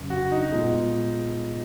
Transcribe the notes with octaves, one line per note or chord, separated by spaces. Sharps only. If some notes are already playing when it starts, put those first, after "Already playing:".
Already playing: F2 C#3 F#3 C#4
F#4
D#4
A#2 G#3 B3 F4 G#4